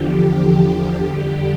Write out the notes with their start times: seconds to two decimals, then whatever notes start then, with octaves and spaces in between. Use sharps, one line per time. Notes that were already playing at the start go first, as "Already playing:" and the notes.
Already playing: E2 D3 F3 G4
1.00 F2 D3 G3